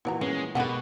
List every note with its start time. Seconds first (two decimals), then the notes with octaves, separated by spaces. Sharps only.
0.05 A#2 E3 B3 F#4 D5 A#5
0.21 G#3 B3 C#4
0.55 B2 D#3 G#3 B3 G4 B4 F#5